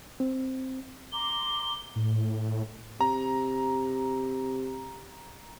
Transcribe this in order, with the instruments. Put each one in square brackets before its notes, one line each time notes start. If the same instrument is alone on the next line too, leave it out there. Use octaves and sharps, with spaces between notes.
[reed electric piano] C4
[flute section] A#5 C6 D6 [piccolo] G7
[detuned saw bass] A2
[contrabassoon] C3 [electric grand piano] A#5